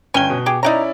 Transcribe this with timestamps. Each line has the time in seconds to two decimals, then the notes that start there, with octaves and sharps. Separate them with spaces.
0.14 G1 C#4 C#5 G5 G#5 G7
0.30 B2
0.46 G4 G#4
0.63 C#4 D#4 E4 G4 D5 A#5